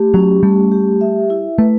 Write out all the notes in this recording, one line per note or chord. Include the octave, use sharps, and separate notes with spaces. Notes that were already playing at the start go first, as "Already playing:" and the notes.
Already playing: A3 G4
F#3 C#4
G3 A3
G4
E5
E4
A3 B4